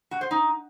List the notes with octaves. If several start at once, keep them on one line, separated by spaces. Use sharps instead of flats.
F#4
C5
D#4